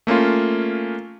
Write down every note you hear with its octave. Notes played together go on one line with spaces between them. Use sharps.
A3 A#3 C#4 F4